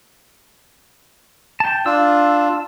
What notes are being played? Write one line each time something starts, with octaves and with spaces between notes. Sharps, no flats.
G5 A5
D4 F4 E6